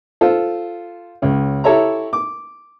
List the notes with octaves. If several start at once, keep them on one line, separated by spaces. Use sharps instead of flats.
F4 A4 C5
C#2 C#4
E4 G4 A4 C#5 E5 A#5
D6